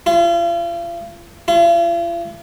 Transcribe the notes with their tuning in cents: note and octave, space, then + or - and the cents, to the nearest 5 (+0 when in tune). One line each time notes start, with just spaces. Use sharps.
F4 -40
F4 -45